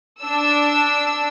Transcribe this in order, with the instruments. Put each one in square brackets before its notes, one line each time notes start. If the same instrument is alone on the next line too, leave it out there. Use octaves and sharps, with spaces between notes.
[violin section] D4 E6